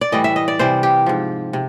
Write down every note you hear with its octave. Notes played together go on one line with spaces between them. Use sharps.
D5
A2 E3 G3 D#5
E5
D#5
D5
C3 E3 G3 C5
G4
G#2 F3
C3